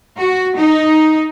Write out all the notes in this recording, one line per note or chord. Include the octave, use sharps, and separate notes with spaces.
F#4
D#4